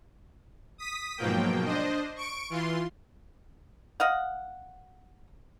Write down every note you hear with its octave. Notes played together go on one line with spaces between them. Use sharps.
D#6 B6
G#2 B2 F3 F#3 A#3 G5
D4 C5 D#5
C#6 D7
E3 F4 C6
D#5 F5 F#5